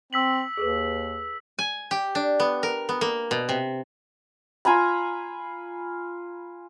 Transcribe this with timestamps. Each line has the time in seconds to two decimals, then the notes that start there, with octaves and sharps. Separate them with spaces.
0.13 C4 E6 B6 F#7
0.57 D#2 G#4 A4 B4
1.59 G#5
1.91 G4
2.15 D4
2.40 B3
2.63 A#4
2.89 B3
3.01 A#3
3.31 B2
3.49 C3
4.65 F4 G#5 A#5 B5